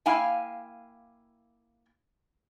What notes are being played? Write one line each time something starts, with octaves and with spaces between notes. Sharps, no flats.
A#3 E4 F5 G5 G#5